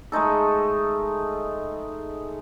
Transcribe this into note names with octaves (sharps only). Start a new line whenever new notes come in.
G#3 A3 D#4 A4